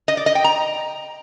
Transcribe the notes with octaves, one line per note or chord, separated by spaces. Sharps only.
D#5
D5
D#5
G5
A#5